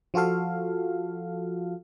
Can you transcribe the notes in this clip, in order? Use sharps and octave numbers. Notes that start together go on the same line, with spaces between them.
F3 F4 F#4 A4 F5